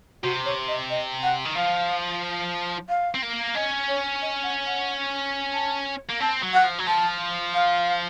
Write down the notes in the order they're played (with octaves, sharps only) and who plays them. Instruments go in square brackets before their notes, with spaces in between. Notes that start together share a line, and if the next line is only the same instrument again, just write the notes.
[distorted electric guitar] C3 [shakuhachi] F#4
[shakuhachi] C#5
D#5
D#5
F#5
[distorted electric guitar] D#3
[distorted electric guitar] F3 [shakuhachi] F5
[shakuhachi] F5
[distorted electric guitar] C4
A#3
[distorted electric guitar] C#4 [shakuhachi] D#5
[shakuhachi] C#5
D#5
F#5
F#5
A5
[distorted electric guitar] A#3
[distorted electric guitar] C4 [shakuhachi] A5
[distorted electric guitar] F#3
[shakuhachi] F#5
[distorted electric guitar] F3
F#3
[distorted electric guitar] F3 [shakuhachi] A5
[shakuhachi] F5